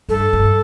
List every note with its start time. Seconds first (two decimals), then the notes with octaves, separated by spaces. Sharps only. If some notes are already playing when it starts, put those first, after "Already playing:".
0.09 G2 A4
0.33 G2